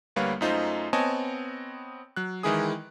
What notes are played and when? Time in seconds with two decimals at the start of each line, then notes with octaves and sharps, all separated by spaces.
0.16 D2 G3 A#3 B4 C#5 F5
0.41 F#2 A3 D#4 F4 C5
0.93 B3 C4 C#5 D#5 G#5 A5
2.17 F#3 F#6
2.43 D#3 E3 G#3 E4 G#4 D#6